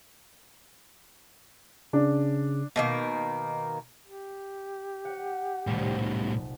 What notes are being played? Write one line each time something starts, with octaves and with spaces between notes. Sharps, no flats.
C#3 D4
B2 D#3 A#3
G4
F#5
D#1 C2 A2 G3
B3